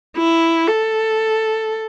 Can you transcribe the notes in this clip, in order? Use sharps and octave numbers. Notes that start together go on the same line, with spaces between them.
E4
A4